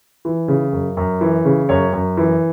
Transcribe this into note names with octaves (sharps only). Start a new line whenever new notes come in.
E3
C#3
F#2
F#2
E3
C#3
F#2 C#5
F#2
E3